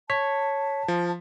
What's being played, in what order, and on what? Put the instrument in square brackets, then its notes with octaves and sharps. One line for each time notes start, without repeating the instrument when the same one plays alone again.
[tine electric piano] C#5 [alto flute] A5 [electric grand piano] B6
[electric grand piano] F3